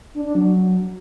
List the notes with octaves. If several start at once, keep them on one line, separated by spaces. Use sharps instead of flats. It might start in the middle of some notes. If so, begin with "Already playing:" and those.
D4
D4
F#3